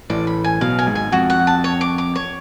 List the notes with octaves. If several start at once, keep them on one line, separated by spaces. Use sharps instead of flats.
A1 A2 D5
B5
G#5
B1 B2 F5
G#5
G#1 G#2
G#5
F2 F#4
F#5
A5
C#5
D6
D6
C#5